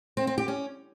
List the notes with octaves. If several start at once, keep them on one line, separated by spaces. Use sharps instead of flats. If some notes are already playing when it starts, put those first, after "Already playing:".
C4
C4
G4
C#4